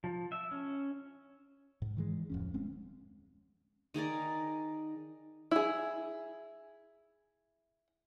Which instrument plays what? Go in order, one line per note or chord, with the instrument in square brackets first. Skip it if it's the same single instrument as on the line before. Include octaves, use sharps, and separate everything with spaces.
[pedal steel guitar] F3
E5
C#4
[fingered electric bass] G#2
D#3 E3 G#3
D1 F2 C#4
G#3 C4 C#4
[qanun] D#3 G#4 A#4 D5
[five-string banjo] E4 G#4